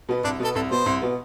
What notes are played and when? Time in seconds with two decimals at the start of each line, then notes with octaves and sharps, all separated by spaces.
0.09 B2 B3
0.24 C2 D4
0.40 B2 B3 A4
0.55 C2 A4
0.71 B2 B3 C5
0.86 C2
1.02 B2 B3